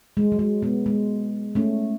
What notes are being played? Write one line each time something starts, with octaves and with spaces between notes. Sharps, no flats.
G#3
F#3
G#3
G#3 B3
G#3
A3 C#4